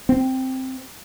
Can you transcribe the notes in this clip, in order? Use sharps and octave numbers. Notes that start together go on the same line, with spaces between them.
C4